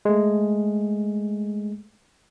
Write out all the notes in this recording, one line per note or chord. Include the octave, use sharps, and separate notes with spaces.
G#3 A3